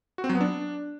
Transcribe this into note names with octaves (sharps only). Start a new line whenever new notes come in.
F#4
C4
F#3
B3
D4